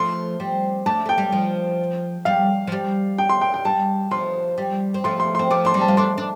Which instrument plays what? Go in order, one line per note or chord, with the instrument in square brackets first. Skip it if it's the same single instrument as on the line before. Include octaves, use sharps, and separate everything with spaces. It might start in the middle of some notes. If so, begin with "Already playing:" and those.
Already playing: [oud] F3 A3 [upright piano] C6
[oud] G3 C4
[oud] A3 D4 [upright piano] A5
[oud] A3 [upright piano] G5
[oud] G3
F3
[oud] G3 [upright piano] F5
[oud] F3
G3
[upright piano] G5
C6
G5
G5
[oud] G3 [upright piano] A5
[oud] F3 [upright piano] C6
[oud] G3
C4
[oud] F3 A3 [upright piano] C6
[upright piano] C6
[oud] C4 [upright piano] C6
[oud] F3 A3 [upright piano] D6
[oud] D4 [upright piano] C6
[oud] G3 C4
[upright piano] A5
[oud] F4
[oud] A3 D4 [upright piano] C6
[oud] D4